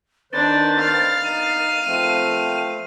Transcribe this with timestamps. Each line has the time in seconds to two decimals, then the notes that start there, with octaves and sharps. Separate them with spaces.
0.33 D#3 D4 B4 C5 A6
0.80 F5
1.24 D#4 D#7
1.86 F3 A3 C4